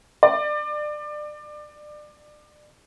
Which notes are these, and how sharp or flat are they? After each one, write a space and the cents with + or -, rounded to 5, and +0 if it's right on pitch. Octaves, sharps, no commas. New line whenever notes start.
D5 +25